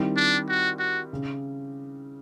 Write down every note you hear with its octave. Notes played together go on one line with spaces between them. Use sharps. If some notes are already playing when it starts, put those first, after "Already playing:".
Already playing: D#3 G3 C4 E4
D4
F#4
F#4
C#3